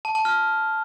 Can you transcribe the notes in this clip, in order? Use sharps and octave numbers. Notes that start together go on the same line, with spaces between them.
A5
A5
F6